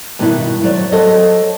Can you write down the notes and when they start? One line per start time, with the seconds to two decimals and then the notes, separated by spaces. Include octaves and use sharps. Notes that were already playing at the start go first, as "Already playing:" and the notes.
0.19 G2 B2 D#3 B3 E4
0.64 F#3 C5 D5
0.92 F#3 A4 C5 D#5